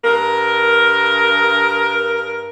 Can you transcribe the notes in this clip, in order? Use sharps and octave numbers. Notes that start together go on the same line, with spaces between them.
G2 A#4